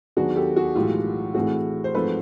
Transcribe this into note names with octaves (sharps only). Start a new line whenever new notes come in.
D#2 D#3 F#3 B3 D4 F#4 G#4
G4 A4
F#4 G#4
B1 A2 E3 G#3 F4 G4
A2 E3 A3 C4 F#4 G#4
C5
G#2 F3 A3 C4 A4 B4